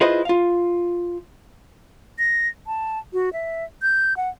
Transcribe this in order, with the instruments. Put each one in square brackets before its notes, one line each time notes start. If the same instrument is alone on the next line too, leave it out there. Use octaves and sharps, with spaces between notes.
[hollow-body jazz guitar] E4 F4 G#4 B4 C5 D#5
F4 F5
[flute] A#6
A5
F#4
E5
G6
F#5